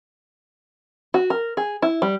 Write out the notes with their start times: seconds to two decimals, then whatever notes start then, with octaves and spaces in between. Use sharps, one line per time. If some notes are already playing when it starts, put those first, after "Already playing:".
1.14 F#4
1.30 A#4
1.57 G#4
1.82 E4
2.02 G3